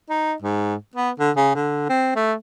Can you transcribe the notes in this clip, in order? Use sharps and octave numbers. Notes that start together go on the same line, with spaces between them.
D#4
G#2
B3
D3
C#3
D3
C4
A3